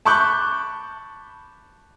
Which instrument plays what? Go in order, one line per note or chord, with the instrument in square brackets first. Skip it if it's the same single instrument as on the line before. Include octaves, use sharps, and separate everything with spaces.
[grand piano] A5 B5 C#6 D6 F#6 G6